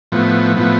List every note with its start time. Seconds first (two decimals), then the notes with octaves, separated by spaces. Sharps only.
0.12 A2 F3 B3
0.57 A2 F3 B3